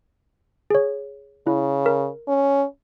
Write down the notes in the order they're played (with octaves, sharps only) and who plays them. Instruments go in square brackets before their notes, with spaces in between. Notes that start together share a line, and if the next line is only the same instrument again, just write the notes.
[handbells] G#4 C#5
[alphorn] C#3 [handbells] E4
[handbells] A#4
[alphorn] C#4